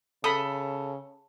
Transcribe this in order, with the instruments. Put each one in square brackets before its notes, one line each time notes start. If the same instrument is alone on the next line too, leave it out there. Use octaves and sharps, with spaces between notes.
[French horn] C#3 [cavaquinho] A4 [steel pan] B5 D#6